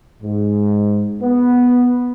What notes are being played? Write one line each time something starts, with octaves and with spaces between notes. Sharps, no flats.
G#2
B3